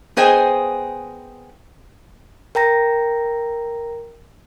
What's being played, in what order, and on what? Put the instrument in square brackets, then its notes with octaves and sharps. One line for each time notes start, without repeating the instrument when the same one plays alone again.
[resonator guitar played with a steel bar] B3 G#4 C5 D#5 G5 G#5
[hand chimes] A#4 G5 A#5 A#6